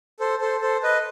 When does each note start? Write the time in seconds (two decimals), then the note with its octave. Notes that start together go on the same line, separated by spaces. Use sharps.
0.20 A4 C5
0.41 A4 C5
0.62 A4 C5
0.83 B4 D#5